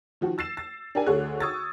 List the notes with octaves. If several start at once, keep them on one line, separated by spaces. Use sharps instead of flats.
D#3 F3 F#4
E6 A6 C7 E7
A6
D4 G4 A#4 G#5
D2 D3 A3 G#4 C#5 F#6
C#6 D#6 E6 G#6 A6